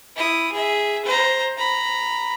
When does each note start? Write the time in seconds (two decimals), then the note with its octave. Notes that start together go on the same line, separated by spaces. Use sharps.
0.16 E4 D#6
0.52 G#4 E5
1.05 C5 A#5
1.57 A#5 B5